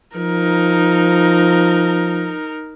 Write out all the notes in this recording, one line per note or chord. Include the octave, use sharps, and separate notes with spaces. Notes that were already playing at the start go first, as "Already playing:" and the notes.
F3 D#4 A#4